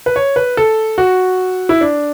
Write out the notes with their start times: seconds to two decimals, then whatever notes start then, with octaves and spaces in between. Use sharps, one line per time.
0.06 B4
0.16 C#5
0.36 B4
0.57 A4
0.98 F#4
1.69 E4
1.81 D4